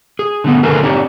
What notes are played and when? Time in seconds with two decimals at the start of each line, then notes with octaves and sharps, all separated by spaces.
0.19 G#4
0.44 D3 A3 B3
0.63 D3 D#3 A3 G#4 A#4 B4
0.83 C4 D4 D#4 G4 C#5